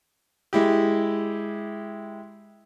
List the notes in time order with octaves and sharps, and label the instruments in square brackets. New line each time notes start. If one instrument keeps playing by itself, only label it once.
[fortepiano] G#3 E4 G4